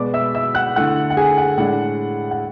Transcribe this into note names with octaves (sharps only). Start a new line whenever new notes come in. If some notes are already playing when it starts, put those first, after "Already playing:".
Already playing: B2 G#3 B3 D5 D6
E5 E6
E5 E6
F#5 F#6
D3 A3 E4 F#5 F#6
F#5
G#4 G#5
F#5
A2 G#3 D4 F#5
F#5